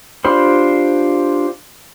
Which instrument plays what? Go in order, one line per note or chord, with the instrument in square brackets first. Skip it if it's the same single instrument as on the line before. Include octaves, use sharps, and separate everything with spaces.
[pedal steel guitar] D4 F4 G4 C5 B5